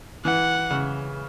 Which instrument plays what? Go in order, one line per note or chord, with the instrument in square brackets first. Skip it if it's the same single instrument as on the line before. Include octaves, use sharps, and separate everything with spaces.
[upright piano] E3 [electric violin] F#5
[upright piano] C#3